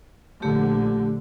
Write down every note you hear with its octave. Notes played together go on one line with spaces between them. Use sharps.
A#1 D3 A3 G4